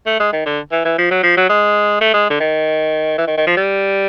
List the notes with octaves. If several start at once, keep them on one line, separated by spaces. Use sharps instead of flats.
A3
G#3
D#3
D3
E3
E3
F3
F#3
F3
F#3
G#3
A3
G#3
D3
D#3
E3
D#3
D#3
F3
G3